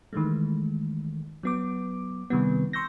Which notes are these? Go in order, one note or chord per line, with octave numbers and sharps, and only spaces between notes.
D#3 E3 G#3 A3
F#3 B3 D6
C3 D#3 G3 B3
C6 C#6 E6 G6 A#6